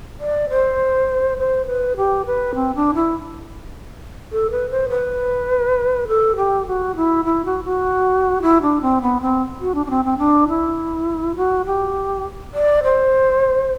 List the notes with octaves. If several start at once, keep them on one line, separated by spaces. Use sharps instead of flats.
D5
C5
C5
B4
G4
B4
C4
D4
E4
A4
B4
C5
B4
A4
G4
F#4
E4
E4
F#4
F#4
E4
D4
C4
B3
C4
F#4
D4
D4
C4
C4
D4
E4
F#4
G4
D5
C5